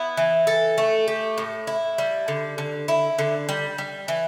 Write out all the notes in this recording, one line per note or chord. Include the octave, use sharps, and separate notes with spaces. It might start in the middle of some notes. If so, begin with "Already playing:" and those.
Already playing: B3 E4
E3
A4
A3
G4
A2
E4
G3
D3
D3
E4
D3
G3
G3
E3